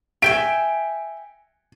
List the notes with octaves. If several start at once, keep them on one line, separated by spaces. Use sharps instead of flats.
E5 G5 G#5 D7